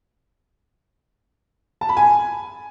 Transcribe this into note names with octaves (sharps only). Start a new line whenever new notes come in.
A5
B5
G#5